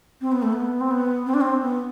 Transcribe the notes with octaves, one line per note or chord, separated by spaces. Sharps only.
C4
B3
A3
B3
C4
B3
C4
D4
C4
B3